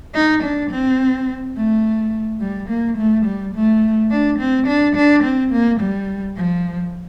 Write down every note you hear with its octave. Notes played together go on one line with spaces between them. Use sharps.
D#4
D4
C4
A3
G3
A#3
A3
G3
A3
D4
C4
D4
D4
C4
A#3
G3
F3